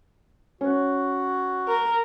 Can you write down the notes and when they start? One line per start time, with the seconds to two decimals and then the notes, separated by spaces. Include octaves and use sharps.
0.61 C#4 F#4
1.68 A#4